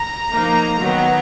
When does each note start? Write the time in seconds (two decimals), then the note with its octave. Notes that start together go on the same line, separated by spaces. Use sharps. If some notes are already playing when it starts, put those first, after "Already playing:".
Already playing: A#5
0.30 F3 A#3 D#4
0.80 D#3 F#3 B3